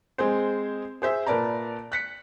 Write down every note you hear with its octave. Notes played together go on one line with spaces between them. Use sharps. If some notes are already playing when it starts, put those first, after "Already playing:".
G#3 C4 G#4 C5
G#4 C5 E5
A#2 A#4 B4 D5 A5 A#5
F#6 B6 C#7